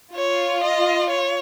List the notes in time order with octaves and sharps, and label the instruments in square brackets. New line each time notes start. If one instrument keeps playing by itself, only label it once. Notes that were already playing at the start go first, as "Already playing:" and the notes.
[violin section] F4 [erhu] C#5
[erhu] D#5
C#5